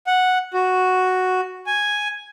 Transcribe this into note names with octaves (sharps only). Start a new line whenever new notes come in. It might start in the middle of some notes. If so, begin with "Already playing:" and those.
F#5
F#4
G#5